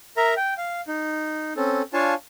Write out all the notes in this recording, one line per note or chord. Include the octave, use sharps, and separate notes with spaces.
A#4 E5 A#5
G5
F5
D#4
C4 C#4 A4
D4 F4 C#5 F5 G#5 A5